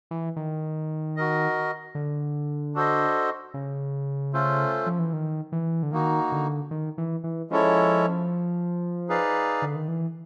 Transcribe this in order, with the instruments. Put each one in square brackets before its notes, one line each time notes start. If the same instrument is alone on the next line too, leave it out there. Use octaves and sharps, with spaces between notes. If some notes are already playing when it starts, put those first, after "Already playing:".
[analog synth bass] E3
D#3
[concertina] F#4 A#4 D#5
[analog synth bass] D3
[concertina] D4 F#4 A4 C5 D#5
[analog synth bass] C#3
[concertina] A3 C#4 F4 A4 C5
[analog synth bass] F3
E3
D#3
E3
D3
[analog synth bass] D#3 [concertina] A#3 D#4 F#4
[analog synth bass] D3
D#3
E3
E3
[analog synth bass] F3 [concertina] G#3 C#4 E4 A4 C#5
[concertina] D#4 G#4 B4 D5 F5
[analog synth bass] D3
D#3
E3